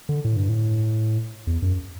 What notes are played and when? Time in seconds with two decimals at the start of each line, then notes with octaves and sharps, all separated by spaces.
0.09 D3
0.24 A2
0.36 G2
0.49 A2
1.47 E2
1.62 F#2